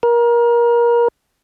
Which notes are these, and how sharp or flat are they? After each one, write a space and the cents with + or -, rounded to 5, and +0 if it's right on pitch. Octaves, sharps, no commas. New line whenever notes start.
A#4 +25